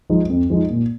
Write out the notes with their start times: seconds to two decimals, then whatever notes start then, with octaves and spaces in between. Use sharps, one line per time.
0.10 F3 G#3 D#4
0.30 F2
0.50 F3 G#3 D#4
0.70 A#2